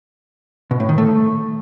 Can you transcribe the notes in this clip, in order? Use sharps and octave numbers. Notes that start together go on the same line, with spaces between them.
B2
A2
D#3
A3